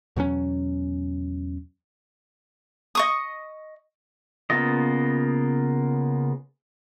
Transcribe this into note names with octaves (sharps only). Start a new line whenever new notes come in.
E2 B2 F#3 C#4
D#5 C#6 D#6
C#3 A#3 B3 F4 D#5